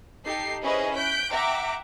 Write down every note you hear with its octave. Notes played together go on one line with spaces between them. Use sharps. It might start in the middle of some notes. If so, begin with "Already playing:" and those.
D#4 G4 A4 C7
C#4 E4 G#4 B4 C5 D#5
F#6 G6 B6 D7
E5 F#5 G5 A#5 D6